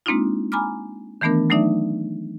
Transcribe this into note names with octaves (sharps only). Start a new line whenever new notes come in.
G#3 A#3 C4 D4 D#4 F4
G#5 A#5 B5 D6 F6
D#3 E3 A3 B3 D4 A#4
F#3 A3 D4 D#4 D5 E5